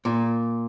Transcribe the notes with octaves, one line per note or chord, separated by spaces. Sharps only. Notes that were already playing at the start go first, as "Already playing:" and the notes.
A#2